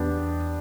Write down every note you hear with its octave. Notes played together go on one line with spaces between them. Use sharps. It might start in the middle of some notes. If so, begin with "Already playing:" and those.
Already playing: E2 B3 D4 G4